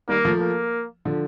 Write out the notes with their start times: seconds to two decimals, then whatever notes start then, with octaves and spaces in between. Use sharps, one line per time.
0.08 D#3 G3 A#3
0.25 F3 A3
0.40 A#3
1.05 D3 F3